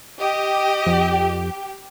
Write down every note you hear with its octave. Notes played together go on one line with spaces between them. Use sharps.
G4 D#5
F2